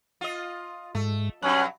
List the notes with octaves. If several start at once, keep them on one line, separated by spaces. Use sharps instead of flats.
F4 D#5
G#2 A3
G2 B2 F#3 C#4 F#6